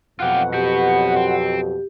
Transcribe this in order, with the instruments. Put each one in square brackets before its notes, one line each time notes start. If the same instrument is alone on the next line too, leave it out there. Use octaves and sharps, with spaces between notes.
[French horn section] F2 B2 F#3 [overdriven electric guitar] F4 G4 [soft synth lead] F#5
[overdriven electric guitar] B3 F#4 [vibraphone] G4
[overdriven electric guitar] C4